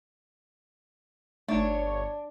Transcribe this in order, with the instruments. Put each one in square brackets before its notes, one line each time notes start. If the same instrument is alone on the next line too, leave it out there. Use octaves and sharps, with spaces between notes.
[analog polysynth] G1 C#5 [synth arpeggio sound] A3 D#4 [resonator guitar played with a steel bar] D4